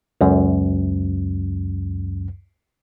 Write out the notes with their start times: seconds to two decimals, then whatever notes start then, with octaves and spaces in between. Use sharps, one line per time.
0.21 C#2 F#2